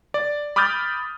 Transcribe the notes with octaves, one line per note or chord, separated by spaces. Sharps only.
D5
B5 D6 D#6 F6 G6 A6